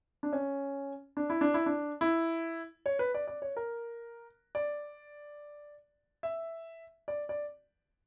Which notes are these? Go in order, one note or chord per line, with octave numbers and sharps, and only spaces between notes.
D4
C#4
D4
E4
D4
E4
D4
E4
C#5
B4
D5
D5
C#5
A#4
D5
E5
D5
D5